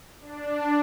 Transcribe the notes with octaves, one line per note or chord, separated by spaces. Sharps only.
D4